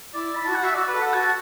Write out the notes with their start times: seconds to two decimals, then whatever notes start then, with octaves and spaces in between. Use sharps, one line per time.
0.13 E4 D5
0.36 B5
0.41 E4
0.45 F#4 A5
0.55 F#5
0.60 F#4 E5
0.74 F#4 D5
0.88 B4
0.94 A4
1.01 F#5
1.14 F#4 A5